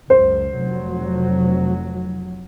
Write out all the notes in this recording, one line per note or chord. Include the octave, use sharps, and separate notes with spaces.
C#2 F#2 C5
F1 F#3